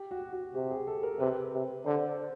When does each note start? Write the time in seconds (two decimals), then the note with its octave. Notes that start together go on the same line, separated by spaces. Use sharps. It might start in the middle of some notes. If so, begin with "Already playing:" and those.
Already playing: G4
0.11 F#4
0.33 F#4
0.54 C3 G4
0.71 G#4
0.87 A4
1.03 A#4
1.20 C3 B4
1.53 C3
1.86 D3 C5